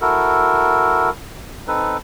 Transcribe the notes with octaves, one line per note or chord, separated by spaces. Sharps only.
E4 F#4 A4 A#4
C4 D#4 A4 B4